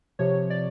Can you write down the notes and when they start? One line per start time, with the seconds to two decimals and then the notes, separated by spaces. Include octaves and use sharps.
0.19 C3 F3 C#5
0.50 D5